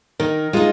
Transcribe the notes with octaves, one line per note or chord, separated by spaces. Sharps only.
D#3 A#4
G#3 D#4 F4